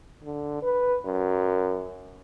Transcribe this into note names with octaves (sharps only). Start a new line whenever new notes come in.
D3
B4
F#2